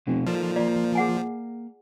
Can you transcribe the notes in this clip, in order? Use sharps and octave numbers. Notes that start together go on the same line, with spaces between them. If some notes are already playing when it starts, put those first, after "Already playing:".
F1 B2 F3
A#2 F3 D#4 A4 B4 D5
A#3 F4 D5
G#4 F#5 G#5